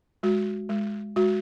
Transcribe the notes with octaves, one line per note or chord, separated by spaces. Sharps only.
G#3 F#4
G#3
G#3 F#4